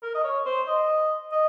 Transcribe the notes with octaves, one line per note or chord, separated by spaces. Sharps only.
A#4
D#5
C#5
C5
D#5
D#5